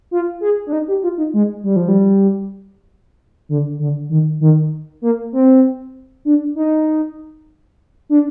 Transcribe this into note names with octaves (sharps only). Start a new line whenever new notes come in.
F4
G#4
D4
D#4
G4
F4
D#4
G#3
G3
F3
G3
D3
D3
D#3
D#3
A#3
C4
D4
D#4
D4